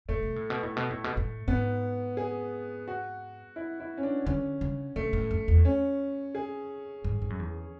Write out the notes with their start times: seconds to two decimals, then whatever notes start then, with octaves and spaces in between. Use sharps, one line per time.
0.09 A2 A3
0.23 B2
0.36 A2
0.50 B2
0.63 A2
0.77 B2
0.90 A2
1.04 B2
1.17 A2
1.48 G#2 B3
2.17 G#4
2.88 F#4
3.56 E4
3.80 E4
3.97 C#4
4.03 D4
4.26 D3 C#4
4.61 C#3
4.96 B2 A3
5.13 A2
5.31 F#2
5.48 E2
5.65 C#4
6.35 G#4
7.04 G#2
7.22 G#2
7.30 F#2
7.39 E2